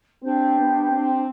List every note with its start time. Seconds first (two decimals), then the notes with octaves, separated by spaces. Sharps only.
0.21 C4 D4 G4 C5
0.57 B3
0.92 C4